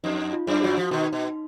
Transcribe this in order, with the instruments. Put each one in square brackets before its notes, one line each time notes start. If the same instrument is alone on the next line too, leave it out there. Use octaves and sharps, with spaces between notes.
[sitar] F2 [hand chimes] D#4
[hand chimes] F4
[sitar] F#2
[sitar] F#3 [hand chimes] F#4
[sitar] F3
[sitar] B2 D#3 [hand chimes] D#4
[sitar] B2